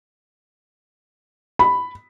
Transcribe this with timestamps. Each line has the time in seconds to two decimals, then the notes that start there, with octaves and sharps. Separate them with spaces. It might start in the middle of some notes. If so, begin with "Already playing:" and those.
1.59 B5